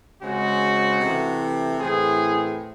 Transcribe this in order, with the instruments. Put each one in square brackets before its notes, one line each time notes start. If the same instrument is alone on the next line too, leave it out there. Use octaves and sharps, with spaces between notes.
[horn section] C#3 G#3 C4 F#4
C3 E3 A3
A2 E3 C4 G#4